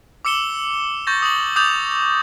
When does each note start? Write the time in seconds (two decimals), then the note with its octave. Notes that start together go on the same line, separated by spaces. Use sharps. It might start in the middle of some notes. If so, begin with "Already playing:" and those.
0.25 D6 E6 C#7 E7 G7
1.07 C#6 G6 A6 A#6
1.22 D#6 F#7
1.56 D6 D#6 G6 A6 F7